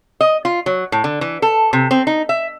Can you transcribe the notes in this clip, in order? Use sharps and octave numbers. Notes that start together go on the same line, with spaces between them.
D#5
F4
F#3
A2
D3
E3
A4
C3
C4
D#4
E5